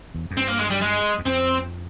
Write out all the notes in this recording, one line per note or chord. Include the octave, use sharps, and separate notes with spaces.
E2
F2
G2 C4
A#3
G#3
G3
G#3
E2
F2 C4